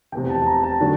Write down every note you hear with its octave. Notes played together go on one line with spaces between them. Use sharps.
F1 E2 C3 G5
A5
A5
A#5
A5
D3 F#3 A3 D4